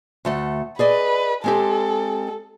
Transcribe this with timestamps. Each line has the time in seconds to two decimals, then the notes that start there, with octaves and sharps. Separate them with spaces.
0.25 D2 A3 F#5
0.79 G#4 B4 D5 D#5
1.44 G#3 C4 G4 A4